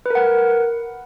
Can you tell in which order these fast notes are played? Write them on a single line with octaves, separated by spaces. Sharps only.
B4 A#4 F#5